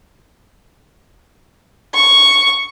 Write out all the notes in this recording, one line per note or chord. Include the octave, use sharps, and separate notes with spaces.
C#6